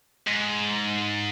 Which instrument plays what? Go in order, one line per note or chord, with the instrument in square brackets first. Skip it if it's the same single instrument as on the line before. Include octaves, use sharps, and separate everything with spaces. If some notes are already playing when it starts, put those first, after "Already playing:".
[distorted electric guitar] G#2